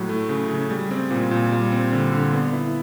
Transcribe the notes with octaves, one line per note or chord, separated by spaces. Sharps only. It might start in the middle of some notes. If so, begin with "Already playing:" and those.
Already playing: A2 F#3
A3
C#3
C#3
G3
C4
A#2
A#2
G3
C4
D3
D3
B3
E4